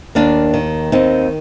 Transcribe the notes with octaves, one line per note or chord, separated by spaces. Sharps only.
D#2 A#3 D4
D#3
D#2 C4 D#4